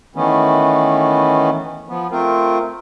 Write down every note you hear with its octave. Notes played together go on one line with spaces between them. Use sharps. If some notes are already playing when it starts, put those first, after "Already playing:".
D#3 E3 A3 B3 C#4
F3 B3
A3 C4 F4 A#4